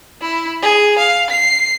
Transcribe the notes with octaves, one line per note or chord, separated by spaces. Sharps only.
E4
G#4
F5
C7